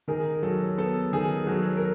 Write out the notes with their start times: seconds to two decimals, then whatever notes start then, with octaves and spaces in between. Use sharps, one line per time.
0.08 D#3 G#4 A#4
0.43 F#3 A4
0.78 B3 A4
1.13 D#3 G#4
1.47 F#3 A4
1.77 A#4